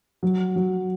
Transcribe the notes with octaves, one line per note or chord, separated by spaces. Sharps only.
F#3
F#3